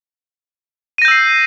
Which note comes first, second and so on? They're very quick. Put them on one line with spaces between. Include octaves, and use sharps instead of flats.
D#7 A#6 G6 E6 C7